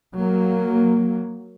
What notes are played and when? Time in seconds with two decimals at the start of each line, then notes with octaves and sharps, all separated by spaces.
0.15 F#3 A#3